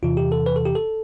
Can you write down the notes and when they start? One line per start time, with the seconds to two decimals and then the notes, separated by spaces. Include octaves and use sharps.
0.03 E2 C3 E3 F4
0.17 G4
0.32 A4
0.46 B4
0.56 A4
0.66 G4
0.75 A4